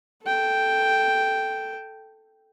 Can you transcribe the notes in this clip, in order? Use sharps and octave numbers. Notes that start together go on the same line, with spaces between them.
A4 G5